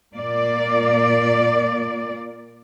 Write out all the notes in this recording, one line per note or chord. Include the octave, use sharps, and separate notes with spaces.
A#2 A#3 D5